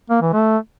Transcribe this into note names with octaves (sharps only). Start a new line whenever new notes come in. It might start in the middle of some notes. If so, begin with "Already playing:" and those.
A#3
E3
A3